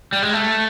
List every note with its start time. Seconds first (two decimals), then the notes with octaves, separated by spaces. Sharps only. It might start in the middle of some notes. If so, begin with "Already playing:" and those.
0.13 G3
0.22 G#3
0.33 A3